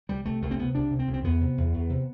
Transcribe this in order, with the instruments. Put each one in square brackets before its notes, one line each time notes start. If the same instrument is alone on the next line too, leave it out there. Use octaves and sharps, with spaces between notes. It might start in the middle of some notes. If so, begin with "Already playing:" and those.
[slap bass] C2 G3
C3 A3
C2 A3
C4
C3 B3
C2 D4
C3
C4
C2
C4
E2 B3
C3
E2
E2
C3